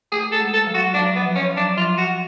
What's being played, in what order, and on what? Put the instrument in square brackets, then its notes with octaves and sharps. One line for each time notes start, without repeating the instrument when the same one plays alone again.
[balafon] A3 [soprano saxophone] G#4
[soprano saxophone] A4
[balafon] G#3
[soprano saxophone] A4
[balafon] F#3
[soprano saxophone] F#4
[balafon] F#3 [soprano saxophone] D4
[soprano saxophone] B3
[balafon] F3
[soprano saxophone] C#4
[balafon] F#3
[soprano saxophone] D4
[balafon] F3 [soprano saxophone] F4
[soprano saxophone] F#4